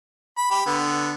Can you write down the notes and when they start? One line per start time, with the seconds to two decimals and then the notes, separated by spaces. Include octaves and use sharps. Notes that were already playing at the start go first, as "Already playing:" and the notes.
0.37 B5
0.51 G4 B5
0.66 D3 B3